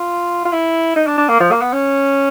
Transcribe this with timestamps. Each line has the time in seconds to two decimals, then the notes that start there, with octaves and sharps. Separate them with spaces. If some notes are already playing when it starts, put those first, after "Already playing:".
Already playing: F4
0.45 F4
0.52 E4
0.96 D#4
1.07 D4
1.18 D4
1.29 A#3
1.40 F3
1.52 A#3
1.62 B3
1.73 C#4